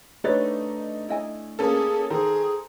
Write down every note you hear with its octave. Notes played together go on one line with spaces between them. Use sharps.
A3 D4 D#4 G4 B4 C#5 A6
E4 D#5 G#5
A#3 C#4 G#4 A4
D#3 G#4 A4 C5 A#5